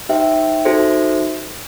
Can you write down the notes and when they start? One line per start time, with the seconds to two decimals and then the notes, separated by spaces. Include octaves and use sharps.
0.09 D#4 G4 C5 E5 G5
0.65 D#4 F#4 A4 C5 E5